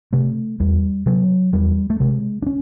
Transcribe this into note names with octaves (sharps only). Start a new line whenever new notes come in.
C3 A3
E2 G3
C3 F#3
E2 G3
A3
C3 G#3
D4
C#4